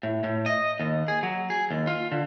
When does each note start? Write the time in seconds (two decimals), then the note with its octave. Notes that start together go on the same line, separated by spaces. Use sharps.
0.03 A2
0.24 A2
0.46 D#5
0.80 D#2
1.08 G#4
1.23 F#3
1.50 G#4
1.71 D#2
1.87 F4
2.12 D3